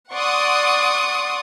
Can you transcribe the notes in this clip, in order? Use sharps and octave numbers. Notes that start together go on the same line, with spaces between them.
D5 F#5 C6 C#6 D#6